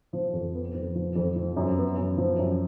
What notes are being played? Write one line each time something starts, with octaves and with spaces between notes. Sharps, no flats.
F3
F2
B3
F2
F3
F2
F3
F#2
B3
F#2
F3
F#2